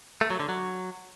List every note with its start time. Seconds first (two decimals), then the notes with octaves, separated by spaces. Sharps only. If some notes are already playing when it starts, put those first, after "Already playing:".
0.21 A3
0.30 F#3
0.40 D3
0.49 F#3